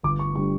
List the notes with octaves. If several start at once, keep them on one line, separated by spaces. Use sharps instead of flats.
G1 D6
C#6
D3 G3 C#6